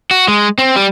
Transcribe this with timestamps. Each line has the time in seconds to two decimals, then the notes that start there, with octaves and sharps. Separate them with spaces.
0.11 F#4
0.28 G#3
0.58 C4
0.76 G3